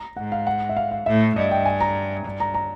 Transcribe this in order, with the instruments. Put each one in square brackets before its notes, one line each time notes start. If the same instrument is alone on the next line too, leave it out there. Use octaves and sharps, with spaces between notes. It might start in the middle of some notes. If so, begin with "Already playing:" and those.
Already playing: [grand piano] A#5
[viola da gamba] G#2 [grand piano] F#5
[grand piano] F5
F#5
E5
F5
F5
[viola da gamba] A2 [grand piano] E5
[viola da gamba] G2 [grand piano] D#5
[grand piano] G5
G#5
A#5
[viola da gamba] G2
[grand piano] A#5
A#5